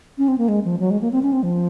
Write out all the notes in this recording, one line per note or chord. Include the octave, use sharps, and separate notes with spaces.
C#4
C4
A#3
G#3
F3
F#3
G#3
A#3
C4
C#4
C4
F3